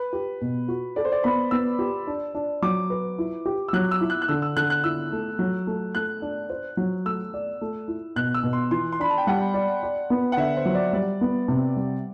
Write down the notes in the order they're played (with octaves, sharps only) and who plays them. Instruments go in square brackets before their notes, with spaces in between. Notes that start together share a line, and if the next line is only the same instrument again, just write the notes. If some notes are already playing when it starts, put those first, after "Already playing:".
Already playing: [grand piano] B4
[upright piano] G4
B2
F#4
[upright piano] A4 [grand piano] D5
[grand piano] C5
D5
[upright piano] B3 [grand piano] B5
[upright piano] B3 [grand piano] E6
[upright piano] G4
D4
D4
[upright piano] F#3 [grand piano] D6
[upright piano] B4
E4
G4
[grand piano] E6
[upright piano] F#3 [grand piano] F#6
[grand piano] E6
[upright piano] E4
[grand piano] F#6
F#6
[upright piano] D3 [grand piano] E6
[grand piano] E6
[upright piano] D3 [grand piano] F#6
[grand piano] F#6
[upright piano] E4 [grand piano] E6
[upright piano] A3
F#3
A3
[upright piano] A3 [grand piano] F#6
[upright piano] D4
C5
F#3
[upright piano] A3 [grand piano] E6
[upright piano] D5
A3
E4
[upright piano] B2 [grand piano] F#6
[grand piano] E6
[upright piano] B2
[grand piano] C6
[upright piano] E3 [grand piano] C6
[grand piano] C6
[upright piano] D4 [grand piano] B5
[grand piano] A5
G5
[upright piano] G3 [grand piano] F#5
[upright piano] D5
D5
B3
[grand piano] F#5
[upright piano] D3 [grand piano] E5
[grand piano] C5
[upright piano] F#3
[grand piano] D5
[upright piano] G3 [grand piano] D5
[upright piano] B3
C3
G3